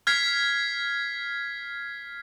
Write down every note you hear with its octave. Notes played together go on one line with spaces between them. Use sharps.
F6 G#6 B6 C7